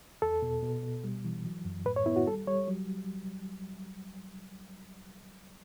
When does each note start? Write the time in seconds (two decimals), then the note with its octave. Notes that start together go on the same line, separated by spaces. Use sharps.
0.22 E2 A4
0.42 B2
0.63 B2
0.83 B2
1.04 G3
1.25 E3
1.45 F#3
1.65 F#2
1.86 A2 B4
1.96 C#5
2.06 B3 E4
2.16 F#4
2.27 G3 A4
2.48 G3 C#5
2.68 F#3